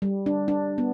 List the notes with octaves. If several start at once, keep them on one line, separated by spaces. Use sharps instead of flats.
G3
D4
D4
B3